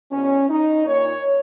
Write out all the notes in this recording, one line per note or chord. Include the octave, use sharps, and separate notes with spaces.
E2 B2 C#4
D#4
A#2 C#5